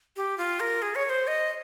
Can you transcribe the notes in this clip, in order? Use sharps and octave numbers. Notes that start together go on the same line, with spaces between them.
G4
F4
A#4
G#4
C#5
C#5
C5
D#5